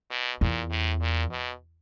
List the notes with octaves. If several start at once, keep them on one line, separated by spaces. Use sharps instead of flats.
B2
E2 A#2
A2
A#2
B2